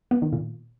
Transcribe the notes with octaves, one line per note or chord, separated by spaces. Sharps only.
B3
D#3
A#2